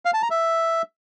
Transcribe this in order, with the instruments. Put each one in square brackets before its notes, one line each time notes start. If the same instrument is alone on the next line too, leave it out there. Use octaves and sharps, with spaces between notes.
[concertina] F5
A5
A#5
E5